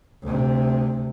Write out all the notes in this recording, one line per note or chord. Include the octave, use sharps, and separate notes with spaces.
D2 C3